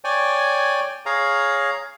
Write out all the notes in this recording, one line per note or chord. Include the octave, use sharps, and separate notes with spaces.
C#5 D5 G5 G#5
G#4 C#5 F5 A#5